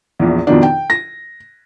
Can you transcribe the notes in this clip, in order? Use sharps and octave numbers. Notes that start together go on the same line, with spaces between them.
A#1 E2
F2 B2 D#3 D4
G5
A#6